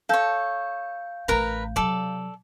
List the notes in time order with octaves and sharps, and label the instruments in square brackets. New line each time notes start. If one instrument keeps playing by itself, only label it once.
[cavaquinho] A4 C#5 [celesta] F5 G6
[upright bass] A1 A2 [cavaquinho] A#4 B4 A#5
[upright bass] C3 F#3 [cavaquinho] A4 D5